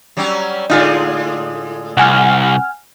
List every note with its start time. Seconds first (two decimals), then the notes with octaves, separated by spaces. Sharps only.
0.17 F#3 G3 C#4
0.70 A2 D3 G#3 D#4 F4 G#4
1.97 C2 F#5 G#5 F6